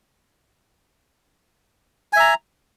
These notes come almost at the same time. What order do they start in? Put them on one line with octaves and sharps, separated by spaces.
G#5 E5 A#5